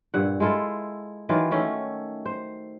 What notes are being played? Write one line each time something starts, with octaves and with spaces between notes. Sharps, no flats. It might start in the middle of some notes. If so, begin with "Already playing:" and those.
G2 A#2 F#5
G#3 E4 F4 A4
D#3 E3 F#3 F4
D#3 A3 C#4
C5